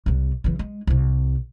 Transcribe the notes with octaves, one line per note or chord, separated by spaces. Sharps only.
C2 C3
C#3 E3
G#3
C2 C3